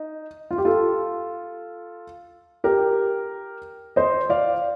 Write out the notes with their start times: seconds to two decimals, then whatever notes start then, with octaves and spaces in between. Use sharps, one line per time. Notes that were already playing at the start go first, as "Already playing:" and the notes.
Already playing: D#4
0.51 F4
0.58 G4
0.65 F4 A4
2.64 G4 A#4
3.96 C5 D#5
4.30 D5 F5